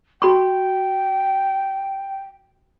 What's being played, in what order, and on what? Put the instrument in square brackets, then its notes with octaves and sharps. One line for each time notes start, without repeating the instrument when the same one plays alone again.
[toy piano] F#4 B5 C#6 [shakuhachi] G5